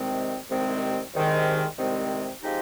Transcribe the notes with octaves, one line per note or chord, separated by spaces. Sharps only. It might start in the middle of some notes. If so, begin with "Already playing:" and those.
Already playing: C2 C3 D#3 G#3 C4
C2 C3 D#3 G#3 C4
C2 C3 D#3 G#3 C4
C2 C3 D#3 G#3 C4
F3 G#3 C4 D#4 G4